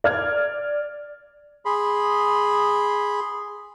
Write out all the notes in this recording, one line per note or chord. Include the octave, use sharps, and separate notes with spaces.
D5 F6 G#6
G#4 B5 C6